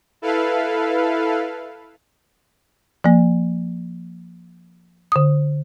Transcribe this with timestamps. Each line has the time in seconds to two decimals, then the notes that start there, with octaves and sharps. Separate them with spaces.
0.22 E4 A4 B4 F5
3.04 F3 A#3
5.12 D3 D#6